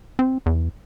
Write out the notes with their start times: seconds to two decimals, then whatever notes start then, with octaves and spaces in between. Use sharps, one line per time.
0.19 C4
0.46 E2